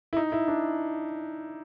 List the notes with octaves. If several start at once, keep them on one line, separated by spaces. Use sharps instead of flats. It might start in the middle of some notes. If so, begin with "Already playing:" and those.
E4
D#4
E4
D4